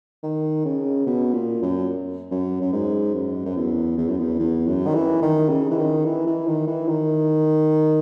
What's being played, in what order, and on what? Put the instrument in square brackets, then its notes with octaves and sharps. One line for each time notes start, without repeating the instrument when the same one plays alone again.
[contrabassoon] D#3
C#3
B2
A#2
F#2
F#2
F#2
G#2
F#2
F#2
E2
E2
F#2
E2
E2
F#2
D#3
E3
D#3
C#3
E3
D#3
E3
E3
D#3
E3
D#3